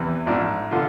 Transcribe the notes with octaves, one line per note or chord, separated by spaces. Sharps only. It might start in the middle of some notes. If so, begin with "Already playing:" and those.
Already playing: E2 C3 E3
A1 G#2 F3 D4
D3 F3 F4